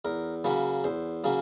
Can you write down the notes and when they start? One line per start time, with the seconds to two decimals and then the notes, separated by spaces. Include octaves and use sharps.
0.05 E2 A#4
0.44 C#3 F#3 A#3 C#4 B4
0.84 E2 C5
1.24 C#3 F#3 A#3 C#4